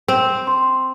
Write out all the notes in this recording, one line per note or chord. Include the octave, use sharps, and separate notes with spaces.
C4
C6